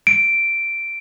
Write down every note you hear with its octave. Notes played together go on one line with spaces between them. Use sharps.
D7